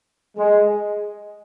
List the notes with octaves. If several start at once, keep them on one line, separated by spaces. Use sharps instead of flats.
G#3